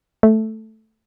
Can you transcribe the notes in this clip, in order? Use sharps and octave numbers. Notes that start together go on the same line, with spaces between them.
A3